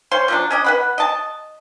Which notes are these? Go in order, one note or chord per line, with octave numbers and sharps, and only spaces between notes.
C5 C#5 F5 C6
F3 F#3 D4
C#4 D4 D#5
B4 F#5 B5
D#5 A5